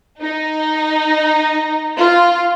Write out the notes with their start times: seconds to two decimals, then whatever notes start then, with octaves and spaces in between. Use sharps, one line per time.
0.22 D#4
1.99 F4